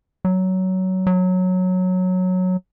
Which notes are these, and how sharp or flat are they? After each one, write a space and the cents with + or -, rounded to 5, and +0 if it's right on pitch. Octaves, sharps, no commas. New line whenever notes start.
F#3 +15
F#3 -10